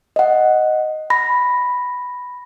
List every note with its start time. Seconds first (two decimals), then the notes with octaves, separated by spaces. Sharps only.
0.16 D#5 F#5
1.10 B5 A#6